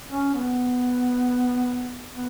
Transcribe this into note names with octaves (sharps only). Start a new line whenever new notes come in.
C#4
B3
B3